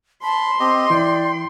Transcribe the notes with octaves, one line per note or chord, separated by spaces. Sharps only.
A5 B5 C6
C4 G4 D#5
E3 E4 D5 G5